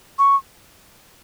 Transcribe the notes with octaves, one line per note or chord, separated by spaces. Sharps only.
C#6